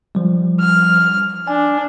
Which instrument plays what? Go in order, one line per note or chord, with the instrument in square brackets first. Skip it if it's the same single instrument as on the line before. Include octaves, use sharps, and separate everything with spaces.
[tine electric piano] F3 G3
[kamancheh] F6
[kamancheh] D4 [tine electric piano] G#5